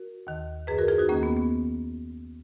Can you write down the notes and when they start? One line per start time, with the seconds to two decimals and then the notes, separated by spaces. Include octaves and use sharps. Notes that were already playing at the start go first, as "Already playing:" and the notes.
Already playing: F#4 A#4
0.27 D#2 D#3
0.67 F#2 D#3 G#4 B4
0.78 F#4 A#4
0.88 F4 G#4
0.98 D#4 F#4
1.09 D#2 D#3 A#3 C#4
1.23 B3
1.37 B3